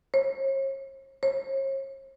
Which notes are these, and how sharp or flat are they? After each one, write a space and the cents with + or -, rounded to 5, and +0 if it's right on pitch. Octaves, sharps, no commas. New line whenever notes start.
C#5 -45
C#5 -45